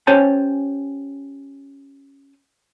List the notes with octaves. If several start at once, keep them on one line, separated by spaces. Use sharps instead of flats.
C#4 G4 C5 C#5 G#5 A5